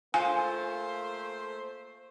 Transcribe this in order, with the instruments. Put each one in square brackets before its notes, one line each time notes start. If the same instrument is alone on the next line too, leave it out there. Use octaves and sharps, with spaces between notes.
[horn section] A3 A#3 C5 [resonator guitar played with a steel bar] F4 [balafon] G#5